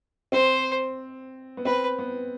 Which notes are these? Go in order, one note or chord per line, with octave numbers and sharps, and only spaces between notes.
C4 C5
B3
C4 B4
B3